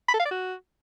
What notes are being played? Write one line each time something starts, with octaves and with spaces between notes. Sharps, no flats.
B5
A4
F5
D5
F#4